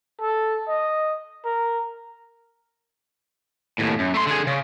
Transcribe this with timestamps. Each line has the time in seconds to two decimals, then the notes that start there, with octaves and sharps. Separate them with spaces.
0.21 A4
0.68 D#5
1.44 A#4
3.78 D#2 A2
3.99 F#2
4.14 A3 C6
4.27 D3 G#4
4.47 C#3